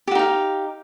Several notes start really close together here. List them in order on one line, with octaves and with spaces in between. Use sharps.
G4 F#4 D#4 F5